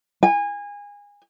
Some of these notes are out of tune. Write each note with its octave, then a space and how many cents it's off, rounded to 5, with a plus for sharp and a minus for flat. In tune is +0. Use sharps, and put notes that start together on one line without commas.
G#5 -25